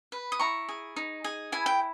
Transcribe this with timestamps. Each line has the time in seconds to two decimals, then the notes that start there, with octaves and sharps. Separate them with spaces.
0.12 B4
0.32 D#6
0.39 E4 A#5 C#6
0.69 G#4
0.96 D#4
1.24 G#4
1.52 E4 G#5
1.66 G5